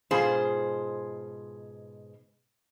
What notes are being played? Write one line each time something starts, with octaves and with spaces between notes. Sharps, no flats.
G#2 B2 F4 G#4 C5